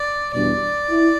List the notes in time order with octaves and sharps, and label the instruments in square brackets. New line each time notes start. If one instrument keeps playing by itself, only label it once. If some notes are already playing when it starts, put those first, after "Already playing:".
Already playing: [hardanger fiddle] D5
[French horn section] E2 B2 G3 D4 [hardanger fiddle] D5
[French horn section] E4